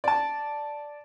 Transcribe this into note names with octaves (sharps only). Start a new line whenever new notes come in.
D5 A5